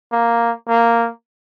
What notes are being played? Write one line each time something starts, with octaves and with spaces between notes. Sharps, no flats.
A#3
A#3